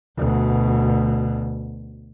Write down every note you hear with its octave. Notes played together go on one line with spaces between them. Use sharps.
D2 B2